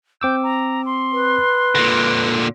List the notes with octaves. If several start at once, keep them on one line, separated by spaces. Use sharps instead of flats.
C4 D6 E6 G6
A#5
C6
B4
A#2 D3 A#6